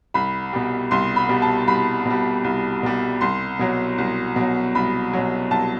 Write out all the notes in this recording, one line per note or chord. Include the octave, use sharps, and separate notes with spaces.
C2 B5
B2 G3
C2 C6
B5
B2 G3
A5
C2 B5
B2 G3
C2
B2 G3
C2 C6
B2 F#3
C2
B2 F#3
C2 B5
B2 F#3
C2 A5